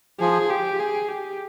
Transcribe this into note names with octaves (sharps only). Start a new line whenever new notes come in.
F3 G#4
G4
G#4
G4